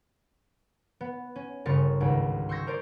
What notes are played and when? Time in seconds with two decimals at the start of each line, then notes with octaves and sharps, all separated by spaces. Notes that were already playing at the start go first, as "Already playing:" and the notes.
1.01 B3
1.36 C#4
1.66 G1 C#3 A#4 C6 C#6 A6
2.00 G#1 C#2
2.49 C6 C#6 E6 G6 G#6 A#6
2.67 A#4 C5 D5